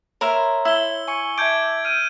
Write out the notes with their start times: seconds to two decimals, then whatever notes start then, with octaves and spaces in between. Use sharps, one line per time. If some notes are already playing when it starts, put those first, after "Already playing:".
0.21 A#4 C#5 E5 B5 C6
0.65 E4 E6 G7
1.08 G#5 C#6 C#7
1.38 E5 A5 D6 G6 G#6 D7
1.85 F6 G6 D7 D#7